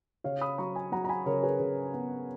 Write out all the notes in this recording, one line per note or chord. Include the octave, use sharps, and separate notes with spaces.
C#3 C#5 F5
B5 D#6
F#3 A#5 C#6
G#5 B5
F#3 F#5 A#5
A#5
G#5 B5
C#3 A#4 C#5
G#4 B4
C#3
B3